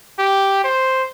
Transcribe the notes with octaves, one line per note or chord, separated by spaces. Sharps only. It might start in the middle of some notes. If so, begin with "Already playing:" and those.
G4
C5